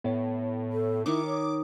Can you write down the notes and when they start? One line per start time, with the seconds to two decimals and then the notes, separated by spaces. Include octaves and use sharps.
0.04 A2 B3 C#5
0.72 A4
1.06 D#3 D#4 E4 C#6 D6
1.27 C#5